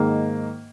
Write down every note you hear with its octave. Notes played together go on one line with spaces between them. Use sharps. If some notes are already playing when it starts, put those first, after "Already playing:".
Already playing: G#2 D#3 A#3